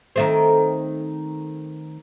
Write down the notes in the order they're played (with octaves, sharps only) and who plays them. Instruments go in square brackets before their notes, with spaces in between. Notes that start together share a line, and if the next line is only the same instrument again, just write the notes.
[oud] D#3 A3 C4